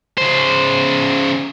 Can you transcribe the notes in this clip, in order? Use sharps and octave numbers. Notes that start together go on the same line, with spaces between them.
C#3 C5